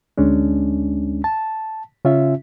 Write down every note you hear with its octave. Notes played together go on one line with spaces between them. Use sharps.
D2 G#3 C#4 D4
A5
C#3 C#4 F4 E5